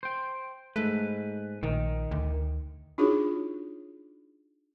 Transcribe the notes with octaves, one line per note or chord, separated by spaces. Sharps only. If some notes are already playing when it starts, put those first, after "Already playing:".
C5 G5
G#2 A3 B4
A#1 D#3
D2
D4 D#4 F4 F#4 G#4 C#5